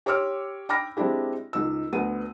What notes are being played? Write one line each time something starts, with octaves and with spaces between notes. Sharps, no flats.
G4 C#5 C6 D6 E6 F6
G5 B5 D6 F6 A#6
G#3 C4 D4 E4 G4
C#2 D#3 E6
D2 B3 D#7